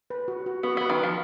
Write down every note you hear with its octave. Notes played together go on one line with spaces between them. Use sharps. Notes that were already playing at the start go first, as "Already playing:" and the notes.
B4
F#4
F#4
B3 F#4
B3 B4
D#3
F#5
F3